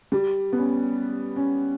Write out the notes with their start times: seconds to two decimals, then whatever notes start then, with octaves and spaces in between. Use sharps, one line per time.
0.12 G3
0.53 B3
0.58 C#4
1.36 C#4